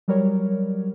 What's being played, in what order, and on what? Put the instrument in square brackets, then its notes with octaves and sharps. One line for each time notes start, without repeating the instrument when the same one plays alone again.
[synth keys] F#3 G3 A#4 C#5